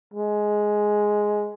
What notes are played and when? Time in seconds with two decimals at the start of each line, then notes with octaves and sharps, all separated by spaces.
0.14 G#3